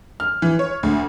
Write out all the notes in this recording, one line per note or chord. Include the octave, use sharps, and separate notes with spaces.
F6
E3
C#5
D2